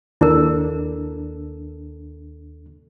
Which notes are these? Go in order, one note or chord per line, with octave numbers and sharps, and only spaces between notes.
D#2 D4 E4 A4 A#4